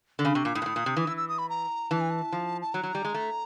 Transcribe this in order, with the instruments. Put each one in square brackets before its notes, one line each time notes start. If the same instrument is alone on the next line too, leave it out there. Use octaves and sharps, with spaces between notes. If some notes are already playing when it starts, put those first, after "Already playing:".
[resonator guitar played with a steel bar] D3
[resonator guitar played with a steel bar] C#3 [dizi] B5
[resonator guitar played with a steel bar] C3 [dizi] C#6
[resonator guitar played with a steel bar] A#2 [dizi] D6
[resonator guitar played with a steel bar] A2 [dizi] D#6
[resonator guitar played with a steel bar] A#2
A2
A#2
C3
E3
[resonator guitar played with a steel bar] E3 [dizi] E6
[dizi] E6
D#6
B5
A#5
[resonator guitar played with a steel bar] E3 [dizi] A5
[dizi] G#5
A5
[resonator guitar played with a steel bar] F3
[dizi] A5
[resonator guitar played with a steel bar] F#3 [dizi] A#5
[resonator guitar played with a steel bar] F#3
G3
G#3
A3